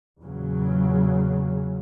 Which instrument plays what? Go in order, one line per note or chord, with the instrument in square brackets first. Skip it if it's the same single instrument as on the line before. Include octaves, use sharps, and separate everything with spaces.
[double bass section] E2 A#2 C#3 F#3